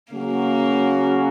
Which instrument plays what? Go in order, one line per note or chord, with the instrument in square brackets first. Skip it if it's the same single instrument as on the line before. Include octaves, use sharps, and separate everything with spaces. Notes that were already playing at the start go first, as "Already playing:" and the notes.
[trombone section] C#3 F#3 C#4 F#4 [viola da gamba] A#3